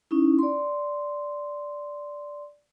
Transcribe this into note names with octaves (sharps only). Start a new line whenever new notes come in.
C#4 D#4 E4
D5 C6